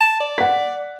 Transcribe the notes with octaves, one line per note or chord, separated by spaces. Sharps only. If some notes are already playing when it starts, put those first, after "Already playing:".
A5
D5
F#5 B6